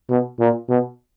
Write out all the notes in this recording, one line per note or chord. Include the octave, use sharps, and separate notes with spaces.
B2
A#2
B2